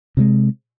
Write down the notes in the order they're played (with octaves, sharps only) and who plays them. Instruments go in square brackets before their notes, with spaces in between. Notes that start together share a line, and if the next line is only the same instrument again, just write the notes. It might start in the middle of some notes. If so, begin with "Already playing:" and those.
[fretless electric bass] C3 D#3 G#3